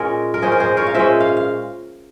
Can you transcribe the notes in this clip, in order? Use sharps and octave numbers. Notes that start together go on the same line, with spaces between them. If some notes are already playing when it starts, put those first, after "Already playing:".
Already playing: A#2 G#3 C#4 A#4 C#5
A#4
A#2 G#3 C#4 G#4 C5
A#4
G#4 C5
A#4 C#5
F5
A#2 G#3 C#4 C5 E5
F5
F5